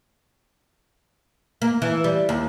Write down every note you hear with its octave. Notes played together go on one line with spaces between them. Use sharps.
A#3
E3
G3
D#2